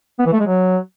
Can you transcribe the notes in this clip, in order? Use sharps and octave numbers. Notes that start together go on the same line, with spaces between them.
B3
E3
A3
G#3
F#3